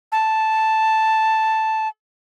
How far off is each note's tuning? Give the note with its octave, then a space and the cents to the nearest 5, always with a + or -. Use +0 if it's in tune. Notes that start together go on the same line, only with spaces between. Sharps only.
A5 +0